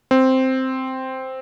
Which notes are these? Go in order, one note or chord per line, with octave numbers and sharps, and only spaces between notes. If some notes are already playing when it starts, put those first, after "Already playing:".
C4